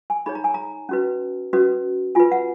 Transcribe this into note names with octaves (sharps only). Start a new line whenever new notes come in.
G#5
D#4 G#4 C#5 B5
A#5
G#5
A#5
C#4 F#4 B4
C#4 F#4 B4
F4 B4 G#5
F#5